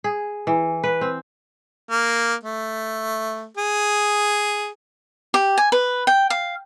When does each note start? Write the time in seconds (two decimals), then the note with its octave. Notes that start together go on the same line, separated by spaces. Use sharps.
0.04 G#4
0.47 E3
0.83 B4
1.01 C4
1.89 A#3
2.43 A3
3.57 G#4
5.34 G4
5.57 G#5
5.72 B4
6.07 G5
6.30 F5